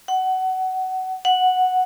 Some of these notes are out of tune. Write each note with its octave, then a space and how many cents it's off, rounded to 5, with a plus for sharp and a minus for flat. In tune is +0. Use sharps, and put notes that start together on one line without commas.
F#5 +20
F#5 -5